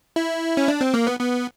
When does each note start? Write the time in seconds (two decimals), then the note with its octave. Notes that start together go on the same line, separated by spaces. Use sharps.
0.16 E4
0.57 C#4
0.68 D4
0.81 C4
0.94 A#3
1.07 B3
1.19 B3